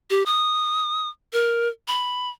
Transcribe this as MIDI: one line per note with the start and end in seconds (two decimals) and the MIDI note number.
0.10 0.23 67
0.26 1.09 87
1.33 1.68 70
1.88 2.30 83